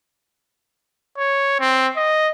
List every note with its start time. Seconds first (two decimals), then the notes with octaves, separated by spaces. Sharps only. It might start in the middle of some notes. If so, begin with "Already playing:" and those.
1.18 C#5
1.60 C4
1.97 D#5